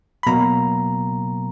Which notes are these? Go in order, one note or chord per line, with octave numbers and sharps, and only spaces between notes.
B5
B2 F#3 A#3 A#5